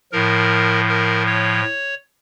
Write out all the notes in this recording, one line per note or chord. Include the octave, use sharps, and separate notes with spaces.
A2 F3 A#4
A#4
C#5